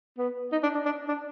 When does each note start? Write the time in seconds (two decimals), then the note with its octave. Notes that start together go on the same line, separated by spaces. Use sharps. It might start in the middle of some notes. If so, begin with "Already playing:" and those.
0.18 B3
0.52 D#4
0.63 D4
0.74 D4
0.85 D4
1.08 D4